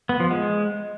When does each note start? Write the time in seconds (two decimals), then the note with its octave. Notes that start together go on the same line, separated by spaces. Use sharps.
0.09 B3
0.20 F3
0.31 G#3